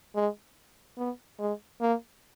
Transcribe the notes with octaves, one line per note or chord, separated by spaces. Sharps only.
G#3
B3
G#3
A#3